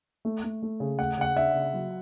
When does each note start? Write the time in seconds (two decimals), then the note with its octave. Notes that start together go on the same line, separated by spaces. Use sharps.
0.25 A3
0.43 A3
0.62 A3
0.80 C#3
0.98 A3 F#5
1.17 C#3 F#5
1.36 D4 E5
1.54 C#3
1.73 F#3